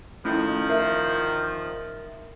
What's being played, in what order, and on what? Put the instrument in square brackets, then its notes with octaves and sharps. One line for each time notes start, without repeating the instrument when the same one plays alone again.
[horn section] D#3 F3 [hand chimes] A3 C#4 E4
[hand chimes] A#4 E5